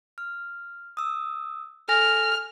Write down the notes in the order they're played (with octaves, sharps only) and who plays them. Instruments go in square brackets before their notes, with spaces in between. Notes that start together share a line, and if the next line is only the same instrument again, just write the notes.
[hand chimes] F6
D#6 E6
[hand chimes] A4 G#5 A#6 [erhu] F6